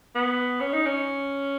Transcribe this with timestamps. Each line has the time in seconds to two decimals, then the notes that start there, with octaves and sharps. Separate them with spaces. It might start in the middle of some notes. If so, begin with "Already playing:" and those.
0.15 B3
0.60 C#4
0.73 D#4
0.86 C#4